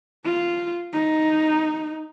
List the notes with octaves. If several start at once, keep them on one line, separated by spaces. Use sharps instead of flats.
F4
D#4